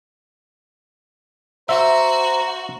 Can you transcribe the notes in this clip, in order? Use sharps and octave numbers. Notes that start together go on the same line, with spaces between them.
F#4 C5 E5 A#5